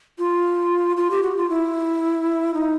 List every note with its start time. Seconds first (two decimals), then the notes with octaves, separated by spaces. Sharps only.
0.18 F4
0.97 F4
1.11 G4
1.23 F#4
1.37 F4
1.50 E4
2.54 D#4